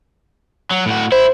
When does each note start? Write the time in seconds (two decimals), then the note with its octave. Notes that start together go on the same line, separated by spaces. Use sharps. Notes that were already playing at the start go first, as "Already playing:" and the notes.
0.71 F#3
0.86 A2 F#4
1.12 E4 C5